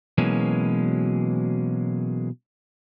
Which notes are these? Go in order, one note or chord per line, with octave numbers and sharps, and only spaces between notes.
B2 E3 F#3 G#3 A#3 C#4